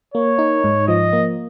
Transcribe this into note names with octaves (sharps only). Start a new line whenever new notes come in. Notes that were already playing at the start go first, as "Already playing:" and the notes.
A#3 C#5
D#4
G#2
F3 D#5
A#3